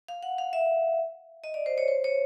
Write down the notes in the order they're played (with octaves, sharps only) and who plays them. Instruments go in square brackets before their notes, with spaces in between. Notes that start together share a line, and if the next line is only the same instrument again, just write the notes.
[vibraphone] F5
F#5
F5
E5
D#5
D5
C5
C#5
C5
C#5